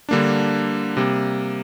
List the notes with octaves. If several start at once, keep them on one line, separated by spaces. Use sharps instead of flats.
D3 G3 A#3 D4
C3 G3 A#3